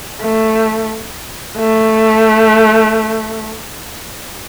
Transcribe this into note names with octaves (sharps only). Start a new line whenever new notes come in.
A3
A3